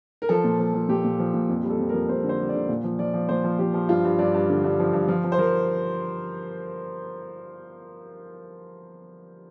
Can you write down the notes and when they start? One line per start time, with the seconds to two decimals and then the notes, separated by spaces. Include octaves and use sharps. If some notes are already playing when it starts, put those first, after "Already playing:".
0.22 A#4
0.29 F3 A4
0.44 A#2
0.59 F3
0.74 F3
0.89 A#2 G4
1.04 A#2
1.19 F3
1.34 A#2
1.49 F2
1.64 G3
1.70 A4
1.79 F2
1.89 F2 A#4
2.09 F2 C5
2.24 D3
2.29 C5
2.39 G3
2.49 D5
2.55 D3
2.69 A#2
2.84 F3
2.99 F3 D5
3.14 F3
3.29 A#2 C5
3.44 F3
3.59 F3 G4
3.74 F3
3.89 G2 F4
4.05 G2
4.19 G2 D5
4.34 G2
4.50 D3
4.64 G2
4.79 F3
4.93 G2
5.08 F3
5.24 F3
5.32 C5
5.38 F3 A#4